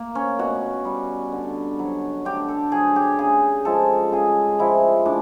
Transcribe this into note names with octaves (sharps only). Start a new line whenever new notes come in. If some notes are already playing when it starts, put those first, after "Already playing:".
Already playing: A#3
C#4
B2 F#4
G3
D3
F#3
D3 G4
A4
F#3 G#4
G4
C#3 G#4
F3 G#3 A4
C#3 G#4
F3 G#3 E4
A2 D4